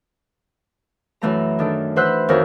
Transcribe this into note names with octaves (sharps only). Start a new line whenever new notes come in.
F#2 E3 A3 A#5
D#3 D4 A4
E3 B4 C5 F#5 E6 F#6
F2 D#3 F#4 A#4 C#5